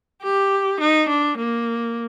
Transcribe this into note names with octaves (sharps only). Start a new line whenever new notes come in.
G4
D#4
D4
A#3